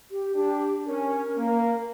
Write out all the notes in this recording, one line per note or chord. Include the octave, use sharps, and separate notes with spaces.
G4
D4 G4
C#4 A#4
A#3